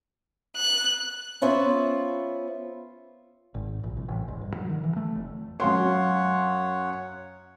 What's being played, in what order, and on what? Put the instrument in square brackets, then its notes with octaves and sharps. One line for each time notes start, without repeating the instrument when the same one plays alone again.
[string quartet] F#6
[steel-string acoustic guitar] B3 C#4 F4 C5 E5
[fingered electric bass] G#1
A#1
C2
A1
E1
G2
F#3
D#3
E3
A3
F1
[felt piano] F#2 F5 C6 [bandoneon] C#5 F#5